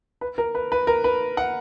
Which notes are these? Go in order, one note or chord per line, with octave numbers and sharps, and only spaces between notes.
B4
A#4
B4
B4
A#4
B4
F#5